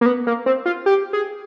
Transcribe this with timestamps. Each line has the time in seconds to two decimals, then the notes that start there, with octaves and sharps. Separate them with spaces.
0.01 A#3
0.06 B3
0.27 A#3
0.46 C4
0.66 F4
0.86 G4
1.13 G#4